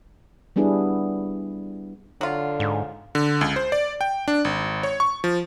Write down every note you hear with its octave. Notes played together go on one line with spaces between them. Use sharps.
G3 B3 D4 E4 G#4 B4
D3 F#3 F4
G#2
D3
C#2
C5
D5
G5
D4
G#1
C#5
C#6
F3